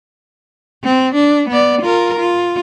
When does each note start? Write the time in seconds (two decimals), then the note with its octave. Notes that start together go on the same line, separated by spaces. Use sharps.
0.84 C4
1.14 D4
1.49 B3 D5
1.81 F4 A#4
2.19 F4